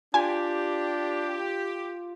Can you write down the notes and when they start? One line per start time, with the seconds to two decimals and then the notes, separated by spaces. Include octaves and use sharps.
0.14 D4 F4 G4 G#5